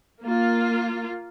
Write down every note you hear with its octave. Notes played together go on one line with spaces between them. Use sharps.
A#3 F4